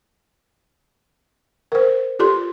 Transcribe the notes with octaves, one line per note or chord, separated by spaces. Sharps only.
A#4 C5
F4 G4 A4 C6